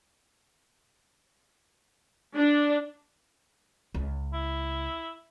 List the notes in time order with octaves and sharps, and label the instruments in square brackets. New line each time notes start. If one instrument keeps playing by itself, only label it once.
[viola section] D4
[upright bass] C#2
[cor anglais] E4